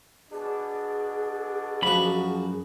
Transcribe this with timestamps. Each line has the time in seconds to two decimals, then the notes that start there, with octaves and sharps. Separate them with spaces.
0.31 B2 D4 G#4
1.82 F#2 F3 F#4 B5